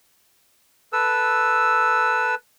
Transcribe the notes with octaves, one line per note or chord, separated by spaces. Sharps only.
A4 B4 E6